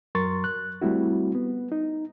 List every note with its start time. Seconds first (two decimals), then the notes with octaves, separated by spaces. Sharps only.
0.15 F#2 F#3 A#4 C6 C#6 A6
0.44 F#6
0.82 G3 A3 C4 E4 F#4
1.35 B3
1.72 D#4